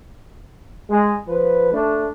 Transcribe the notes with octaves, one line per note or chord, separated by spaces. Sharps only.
G#3
F3 B4
A3 D4